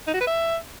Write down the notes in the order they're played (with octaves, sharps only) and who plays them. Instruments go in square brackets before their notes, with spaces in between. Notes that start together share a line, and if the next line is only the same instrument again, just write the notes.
[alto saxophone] D#4
F#4
B4
E5